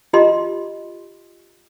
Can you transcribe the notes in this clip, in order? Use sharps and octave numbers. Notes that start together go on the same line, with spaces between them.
F4 G4 D#5 A#5 C6